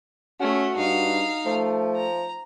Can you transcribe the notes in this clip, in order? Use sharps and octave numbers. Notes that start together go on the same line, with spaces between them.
A3 C#4 F#4
G2 D#4 F5
F3 A3
A#5